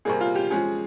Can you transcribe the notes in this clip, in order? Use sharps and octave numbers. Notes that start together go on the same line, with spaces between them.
C3 G3 A#3 G#4
F4
G4
F3 G#3 C#4 G#4